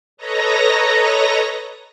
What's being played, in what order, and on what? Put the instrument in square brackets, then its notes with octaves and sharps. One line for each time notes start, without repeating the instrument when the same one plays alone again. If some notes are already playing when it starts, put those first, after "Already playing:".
[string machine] A4 B4 C#5 D#5 A#5 A#6